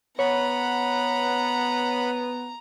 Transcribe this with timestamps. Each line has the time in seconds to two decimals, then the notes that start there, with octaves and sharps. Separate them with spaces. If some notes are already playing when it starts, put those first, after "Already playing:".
0.19 B3 C#5 F#5 A#5 B5